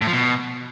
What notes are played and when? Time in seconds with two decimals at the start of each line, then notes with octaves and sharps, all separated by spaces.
0.01 A2
0.07 F3
0.13 B2